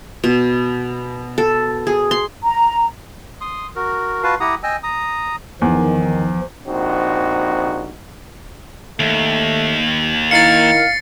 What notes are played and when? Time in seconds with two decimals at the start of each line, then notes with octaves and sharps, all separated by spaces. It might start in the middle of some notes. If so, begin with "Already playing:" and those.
0.24 B2
1.38 A4
1.87 G#4
2.11 C6
2.43 A#5
3.41 C6 D#6
3.76 F#4 A#4
4.23 F4 F#4 B4 F5 A5
4.40 E4 G4 F#5 A#5 D#6
4.63 D#5 G5 G#5 E6
4.83 A#5 D#6
5.62 E2 D#3 F3
6.68 A#1 C4 D#4 F#4
9.00 D#2 A3
10.31 D#3 E4 A#4 F5 A6 C7 C#7